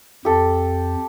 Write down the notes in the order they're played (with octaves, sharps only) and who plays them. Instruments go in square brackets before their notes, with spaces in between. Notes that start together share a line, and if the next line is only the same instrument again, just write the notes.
[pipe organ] F2 [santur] G4 A4